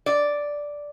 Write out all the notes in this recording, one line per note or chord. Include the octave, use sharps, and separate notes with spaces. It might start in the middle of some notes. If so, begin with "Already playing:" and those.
D5